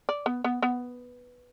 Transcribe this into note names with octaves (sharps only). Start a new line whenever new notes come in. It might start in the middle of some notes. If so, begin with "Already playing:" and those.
D5
B3
B3
B3